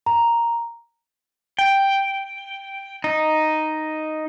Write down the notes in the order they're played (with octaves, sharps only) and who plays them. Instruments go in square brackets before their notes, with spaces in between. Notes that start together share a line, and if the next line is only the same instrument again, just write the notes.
[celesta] A#5
[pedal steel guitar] G5
D#4